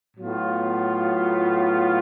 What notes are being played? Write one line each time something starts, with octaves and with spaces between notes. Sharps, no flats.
A2 F#3 B3 F4